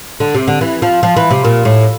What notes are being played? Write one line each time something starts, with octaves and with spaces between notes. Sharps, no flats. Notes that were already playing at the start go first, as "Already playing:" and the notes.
D3
C3
D3
E3
F3
F3
E3
C3
A#2
A2